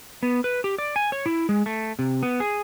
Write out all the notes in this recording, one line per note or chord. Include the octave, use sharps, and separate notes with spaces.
B3
B4
G4
D5
G#5
C#5
E4
G#3
A3
C3
B3
G#4